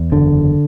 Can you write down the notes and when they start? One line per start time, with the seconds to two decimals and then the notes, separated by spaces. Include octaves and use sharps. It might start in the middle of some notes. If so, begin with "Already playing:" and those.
Already playing: E2
0.12 F#1 D3